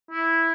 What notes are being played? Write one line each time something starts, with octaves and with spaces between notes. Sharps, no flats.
E4